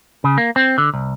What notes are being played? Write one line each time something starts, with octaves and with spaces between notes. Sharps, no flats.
C#3
A#3
C4
D3
C2